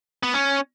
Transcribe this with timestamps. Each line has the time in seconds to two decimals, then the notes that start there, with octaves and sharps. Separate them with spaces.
0.23 B3
0.34 C#4